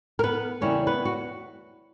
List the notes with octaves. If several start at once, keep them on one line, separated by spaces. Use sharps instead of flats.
A#4
B3 B4
E2 C#3 G3 A#3 C#4 E4 C#5
B3 B4
F#4